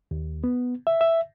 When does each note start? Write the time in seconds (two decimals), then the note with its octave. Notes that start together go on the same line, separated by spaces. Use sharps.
0.11 D#2
0.44 B3
0.87 E5
1.01 E5